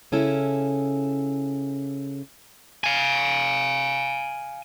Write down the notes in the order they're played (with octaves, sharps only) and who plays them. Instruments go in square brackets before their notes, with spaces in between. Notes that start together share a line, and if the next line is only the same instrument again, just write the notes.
[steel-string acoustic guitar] C#3 C#4 E4 A4
[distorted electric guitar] F5 G#5